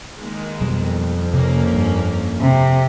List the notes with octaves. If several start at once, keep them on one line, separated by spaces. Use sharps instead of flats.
D#3 G#3 A#3
F2 B2 F#3 G3
C3 A#3 C#4
G2
C3